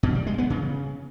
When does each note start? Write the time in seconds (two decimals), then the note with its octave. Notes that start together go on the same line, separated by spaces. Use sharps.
0.03 B2
0.15 G3
0.27 G#3
0.38 B3
0.50 C#3